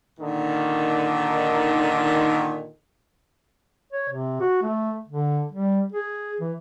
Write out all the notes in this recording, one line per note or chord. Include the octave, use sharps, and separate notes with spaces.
A#2 D3 D#3
C#5
C3
F#4
A3
D3
G3
G#4
E3